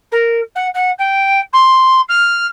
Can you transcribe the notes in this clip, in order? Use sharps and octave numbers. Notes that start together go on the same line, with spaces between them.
A#4
F#5
F#5
G5
C6
F6